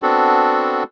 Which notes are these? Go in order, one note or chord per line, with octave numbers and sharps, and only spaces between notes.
B3 C4 D4 F#4 A4